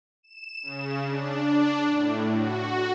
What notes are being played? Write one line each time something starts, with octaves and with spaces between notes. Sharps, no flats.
E7
C#3
D4
A2
F#4